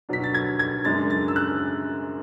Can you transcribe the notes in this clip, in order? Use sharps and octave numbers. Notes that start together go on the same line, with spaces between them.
B2 F#3 B3 D4 B6
A6
G#6
G#6
F#2 C#3 G#3 D4 A6
A6
E6
F#6